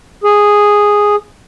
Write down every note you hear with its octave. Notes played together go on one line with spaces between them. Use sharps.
G#4